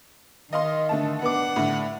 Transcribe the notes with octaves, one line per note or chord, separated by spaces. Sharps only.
D#3 D#5 F5 C6
D3 A3 A5
B3 D4 F#5 D6
A2 D3